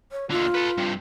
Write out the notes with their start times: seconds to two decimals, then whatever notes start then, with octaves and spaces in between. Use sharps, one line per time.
0.12 C#5
0.30 D#2 D3 F4
0.54 A4 B4
0.77 G2 C3